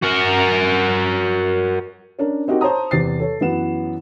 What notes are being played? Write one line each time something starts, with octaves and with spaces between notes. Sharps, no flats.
F#4 A#4
C#4 D4 A#4
C4 D#4 F#4 G4 A#4
C5 C#5 A5 A#5 D#6
E2 C3 A6 C7
A4 C#5
F#2 E3 B3 B4 F#5 E7